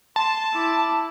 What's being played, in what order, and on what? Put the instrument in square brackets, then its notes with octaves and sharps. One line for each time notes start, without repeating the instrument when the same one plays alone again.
[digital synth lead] A5 [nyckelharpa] C6
[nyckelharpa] E4 D6